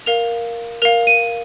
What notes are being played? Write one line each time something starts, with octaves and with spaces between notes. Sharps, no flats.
A#4 F5 F7
A#4 F5 F7
D#7